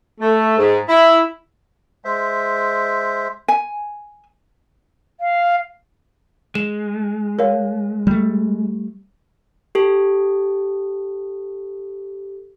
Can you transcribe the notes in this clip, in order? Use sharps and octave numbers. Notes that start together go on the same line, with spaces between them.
A3
G#2
E4
G#3 C5 E5
G#5
F5
G#3 E7
A#4 C#5 F5
G3 A3
G4 A4